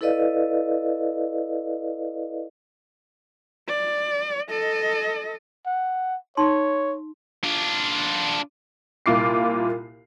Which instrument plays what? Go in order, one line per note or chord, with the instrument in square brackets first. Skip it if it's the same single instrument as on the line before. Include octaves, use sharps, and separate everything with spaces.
[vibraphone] E4 A4 B4 D5 D#5 F5
[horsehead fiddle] D5
A4 D#5
[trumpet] F#5
[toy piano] D#4 C6 [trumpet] C#5
[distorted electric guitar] D4 F4
[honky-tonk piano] C2 A#2 F4 D6 C7